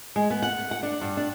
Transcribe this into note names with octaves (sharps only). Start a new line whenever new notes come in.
G#3
B3
F#5
F#5
D4
G2
D4